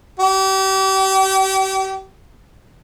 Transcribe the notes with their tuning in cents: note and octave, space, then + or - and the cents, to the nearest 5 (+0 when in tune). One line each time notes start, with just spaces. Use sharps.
G4 -35